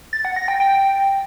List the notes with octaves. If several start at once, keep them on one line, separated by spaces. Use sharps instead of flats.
A6
F#5
A#6
G5
G5